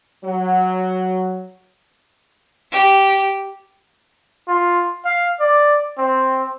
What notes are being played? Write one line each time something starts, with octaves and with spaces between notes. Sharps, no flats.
F#3
G4
F4
F5
D5
C4